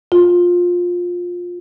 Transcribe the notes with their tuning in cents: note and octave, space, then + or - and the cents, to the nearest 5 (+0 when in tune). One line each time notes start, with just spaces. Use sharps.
F4 +15